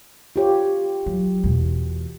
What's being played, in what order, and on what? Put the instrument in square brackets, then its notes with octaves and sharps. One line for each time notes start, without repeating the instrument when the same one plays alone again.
[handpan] F4 G4 C#5
[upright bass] F#3
E2 B2